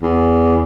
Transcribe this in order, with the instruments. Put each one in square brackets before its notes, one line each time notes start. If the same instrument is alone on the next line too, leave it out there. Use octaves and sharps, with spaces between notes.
[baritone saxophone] E2